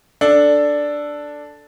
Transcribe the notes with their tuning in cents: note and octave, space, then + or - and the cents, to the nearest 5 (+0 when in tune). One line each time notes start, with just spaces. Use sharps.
D4 +0 A4 +0